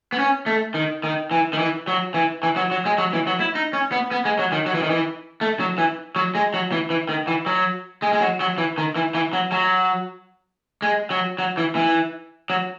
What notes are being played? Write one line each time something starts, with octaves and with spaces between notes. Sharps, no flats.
B3
C#4
A3
D#3
D#3
E3
D#3
E3
F#3
E3
E3
F#3
F#3
G#3
F#3
E3
F#3
E4
D#4
C#4
B3
B3
G#3
F#3
D#3
F#3
E3
D#3
E3
A3
F#3
E3
F#3
G#3
F#3
E3
E3
D#3
E3
F#3
G#3
G#3
F#3
F#3
E3
D#3
E3
E3
F#3
F#3
G#3
F#3
F#3
E3
E3
F#3